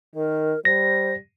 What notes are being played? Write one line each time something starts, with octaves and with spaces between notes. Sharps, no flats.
D#3 A#4
G3 C5 A#6